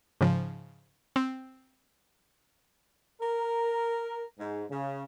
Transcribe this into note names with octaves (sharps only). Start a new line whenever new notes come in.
G#2 C#3 F3
C4
A#4
G#2
C#3